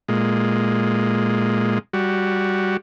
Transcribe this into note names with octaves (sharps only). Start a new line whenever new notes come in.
A#2 G#3
G3 F#4